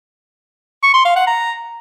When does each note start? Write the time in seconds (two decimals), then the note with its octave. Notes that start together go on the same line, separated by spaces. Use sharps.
0.83 C#6
0.94 C6
1.05 F5
1.16 F#5
1.27 A#5